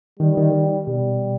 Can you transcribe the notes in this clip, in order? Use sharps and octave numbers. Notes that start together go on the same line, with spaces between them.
D#3 G3
D#3
B2 G3